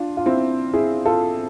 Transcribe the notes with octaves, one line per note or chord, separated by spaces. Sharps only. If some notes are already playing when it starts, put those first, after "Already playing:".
Already playing: D4 F4
F4
C4 E4
E4 G#4
F4 A4